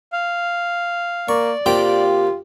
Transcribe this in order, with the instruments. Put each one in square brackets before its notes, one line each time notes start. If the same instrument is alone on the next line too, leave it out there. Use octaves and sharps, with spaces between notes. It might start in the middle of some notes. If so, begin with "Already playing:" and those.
[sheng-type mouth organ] F5
[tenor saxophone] A#3 [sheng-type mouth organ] D5 [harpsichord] C#6
[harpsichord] C3 A#3 G5 [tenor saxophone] F4 [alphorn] G4